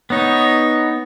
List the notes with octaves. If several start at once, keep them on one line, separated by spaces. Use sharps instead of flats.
B3 D#4 C#5